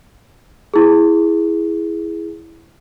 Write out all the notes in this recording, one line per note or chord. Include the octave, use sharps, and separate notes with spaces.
E4 G#4